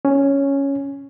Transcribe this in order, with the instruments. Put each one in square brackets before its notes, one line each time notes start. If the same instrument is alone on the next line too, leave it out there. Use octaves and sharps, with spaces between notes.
[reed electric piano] C#4